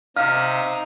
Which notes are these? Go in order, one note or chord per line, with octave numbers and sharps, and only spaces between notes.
C3 D#4 F5 F6